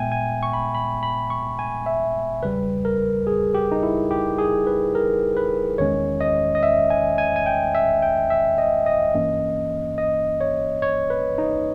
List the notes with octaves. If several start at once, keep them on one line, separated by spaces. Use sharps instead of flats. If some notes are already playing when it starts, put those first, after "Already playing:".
Already playing: A#2 G#3 B3 E5 G5 G#5
G#5
C#6
B5
B5
B5
C#6
G#5
E5
E2 C#3 G3 B4
A#4
G#4
G4
D#4
E4
G4
G#4
B4
A#4
B4
E2 D#3 G#3 C#4 C#5
D#5
D#5
E5
G#5
G#5
G#5
G5
E5
G5
E5
D#5
D#5
G2 E3 A#3 C#4
D#5
C#5
C#5
B4
D#4